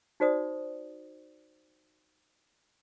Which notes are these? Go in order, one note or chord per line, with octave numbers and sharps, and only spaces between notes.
D#4 F#4 C5 D5 D#6